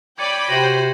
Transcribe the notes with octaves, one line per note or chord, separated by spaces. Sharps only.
C#5 D5 G5 B5 G#6 C#7 D#7
C3 F#4 C5 A#6 D#7 F#7